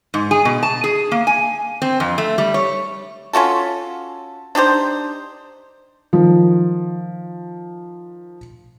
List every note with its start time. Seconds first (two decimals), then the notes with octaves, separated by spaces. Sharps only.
0.14 G#2
0.31 G#4
0.45 B2
0.63 A5
0.84 G#4
1.11 A#3
1.27 G#5
1.82 C4
2.00 F2
2.18 A3
2.38 G3
2.54 C#5
3.33 C#4 F4 F#4 A4
4.55 D4 D#4 G4 C5
6.13 D#3 F3